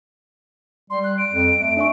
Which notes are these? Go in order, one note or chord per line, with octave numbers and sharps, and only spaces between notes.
G3 C6
F#6
D7
F2
A3
D4 E5 C#6